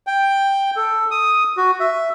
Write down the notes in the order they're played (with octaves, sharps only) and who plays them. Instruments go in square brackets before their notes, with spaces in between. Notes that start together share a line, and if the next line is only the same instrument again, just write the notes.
[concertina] G5
A4
D#6
F#4
E5